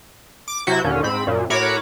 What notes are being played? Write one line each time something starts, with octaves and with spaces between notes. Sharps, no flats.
D6
C3 F#3 E4 F#4 G6
D#2 A#2 D3 C#4
G#2 C4 B5
F#2 A#2
A2 F#4 A#4 C#5 B5 D6